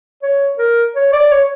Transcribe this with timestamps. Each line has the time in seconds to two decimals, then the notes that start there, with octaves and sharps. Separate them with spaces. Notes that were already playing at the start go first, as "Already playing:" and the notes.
0.22 C#5
0.58 A#4
0.95 C#5
1.13 D5
1.31 C#5